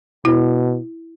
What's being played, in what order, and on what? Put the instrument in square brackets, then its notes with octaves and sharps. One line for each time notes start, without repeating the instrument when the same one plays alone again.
[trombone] B2 [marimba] E4